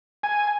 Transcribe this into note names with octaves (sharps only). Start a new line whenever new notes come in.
G#5